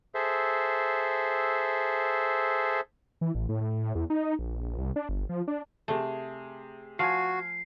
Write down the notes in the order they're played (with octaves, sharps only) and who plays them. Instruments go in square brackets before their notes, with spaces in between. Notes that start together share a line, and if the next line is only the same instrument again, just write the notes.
[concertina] G#4 A4 C5 E5
[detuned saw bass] E3
A1
A2
A2
E2
D#4
A#1
C2
D4
G1
F3
D4
[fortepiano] C3 G#4 [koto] A3
[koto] F3 [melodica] F#4 [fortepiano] F5 G#5 [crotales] C7